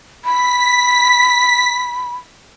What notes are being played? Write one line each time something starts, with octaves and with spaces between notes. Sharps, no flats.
B5 B6